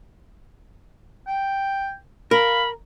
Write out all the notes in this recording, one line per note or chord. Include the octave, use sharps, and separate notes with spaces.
G5
A#4 F5 B5